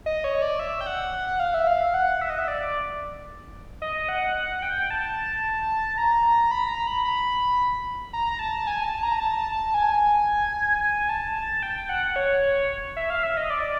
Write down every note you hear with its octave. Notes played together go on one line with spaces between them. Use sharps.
D#5
C#5
D5
E5
G5
F#5
F#5
F#5
F5
E5
F5
F#5
E5
D#5
E5
D5
D#5
F#5
F#5
G5
A5
A#5
B5
A#5
B5
B5
A#5
A5
G#5
A5
A#5
A5
G#5
G#5
A5
A5
G5
F#5
C#5
C#5
E5
F5
E5
D#5
D5